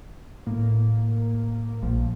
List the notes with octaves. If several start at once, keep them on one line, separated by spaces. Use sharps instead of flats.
A2 A#3
A#1 F3